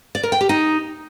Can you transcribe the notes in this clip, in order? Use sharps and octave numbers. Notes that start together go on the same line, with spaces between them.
D5
A#4
G5
G4
D#4